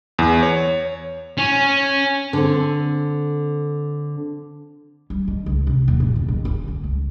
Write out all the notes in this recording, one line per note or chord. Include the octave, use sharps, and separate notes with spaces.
E2
C#5
C#4
D3 C4
G3
D#3
C#2
C3
D#2
A#2
E2
D#3
C#4
D3
C#2